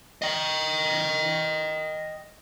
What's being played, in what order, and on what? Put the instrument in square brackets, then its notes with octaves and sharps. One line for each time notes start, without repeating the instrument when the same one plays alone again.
[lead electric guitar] D#5 G5